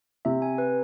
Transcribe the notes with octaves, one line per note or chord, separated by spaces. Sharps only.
C3 E5
G#5
B4